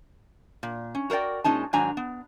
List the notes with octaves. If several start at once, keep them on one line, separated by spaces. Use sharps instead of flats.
A#2
C#4
F#4 A#4 C5 D5 G5
A#2 G#3 C#4 D#4 A5
G#2 D#3 F#3 D4 G#5 A#5
B3